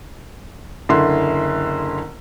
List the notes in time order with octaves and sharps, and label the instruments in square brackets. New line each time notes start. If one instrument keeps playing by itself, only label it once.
[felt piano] F#1 D3 E4 C6